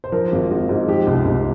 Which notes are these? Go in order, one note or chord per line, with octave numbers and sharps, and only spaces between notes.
C5
F3 A#4
G#1
G#1
G#2
F3 G4
C2
C2